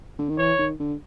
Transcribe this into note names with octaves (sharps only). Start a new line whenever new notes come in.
D3
D#3
E3 C#5
D#3
D3